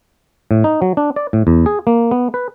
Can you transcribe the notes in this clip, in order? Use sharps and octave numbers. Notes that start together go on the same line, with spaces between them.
A2
D#4
F#3
D4
D5
A2
E2
G#4
A#3
B3
B4